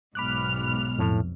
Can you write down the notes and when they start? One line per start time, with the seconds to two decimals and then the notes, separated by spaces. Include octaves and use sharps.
0.15 B1 G#2 B5 D6 F6 F#6
0.99 F2 A2